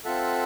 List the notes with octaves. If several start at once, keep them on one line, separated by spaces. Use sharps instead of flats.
C4 F4 A4 E5 F#5